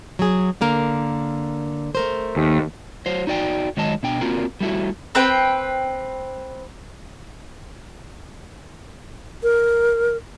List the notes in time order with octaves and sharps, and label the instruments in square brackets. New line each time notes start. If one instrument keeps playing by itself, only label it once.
[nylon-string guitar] F#3 G#4
D3 A#3 A#4
A3 A#4 C5
[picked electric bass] D#2
[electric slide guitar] F#3 C5
D#4 F#4 D5 G5
D#3 F#3 G#3 D#5 A5
B2 D4 G5
A#3 C4 F4 F#4 A#4
G3 A3 E4 F#4
[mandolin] C4 B4 G5
[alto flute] A#4